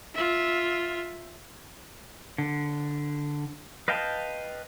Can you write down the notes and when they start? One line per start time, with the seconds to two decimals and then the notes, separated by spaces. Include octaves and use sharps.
0.14 F4 E5
2.38 D3
3.88 B4 D#5 F5 G5 A5